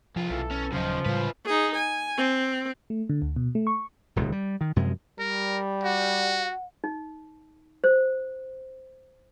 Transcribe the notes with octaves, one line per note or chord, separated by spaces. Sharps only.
C2 F3 F4
B1 E3 A4
C#4
D#1 C#3 F3 F#3 D#4
A2 C#3 G3 F4 B4
D#4 G#4
G#5
C4
A3
D3
D2
B2
A3
C#6
D#1 C#2 B2 D#3
G3
D#3
F#2 C3 F3 G#3
G3 A#4
F#4 F#5
D#4
C5